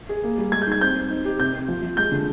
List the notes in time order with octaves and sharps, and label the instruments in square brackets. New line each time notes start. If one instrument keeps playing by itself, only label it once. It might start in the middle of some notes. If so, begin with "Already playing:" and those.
[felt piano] G#4
A#3
G3
[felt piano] G#3 [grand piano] G#6
[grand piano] G6
[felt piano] D#4 [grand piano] G#6
[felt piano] C4 [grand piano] G6
[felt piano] C4
D#4
G4
[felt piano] C3 [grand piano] G6
[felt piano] C3
F3
F3
[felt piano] G#3 [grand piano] G6
[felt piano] D3